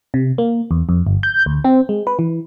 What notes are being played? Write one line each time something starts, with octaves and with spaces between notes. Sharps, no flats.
C3
A#3
E2
F2
G1
G6
D2
C4
G#3
B4
E3